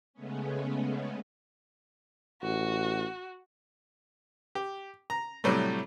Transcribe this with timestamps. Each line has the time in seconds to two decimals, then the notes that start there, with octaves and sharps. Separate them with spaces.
0.14 C#3 G#3 A3 B3 C#4
2.42 A1 F#4
4.55 G4
5.10 A#5
5.44 A2 C3 F#3 G3 A3